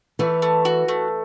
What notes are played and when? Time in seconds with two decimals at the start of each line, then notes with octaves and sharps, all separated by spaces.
0.19 E3 A3
0.42 A3
0.65 F#4
0.88 A3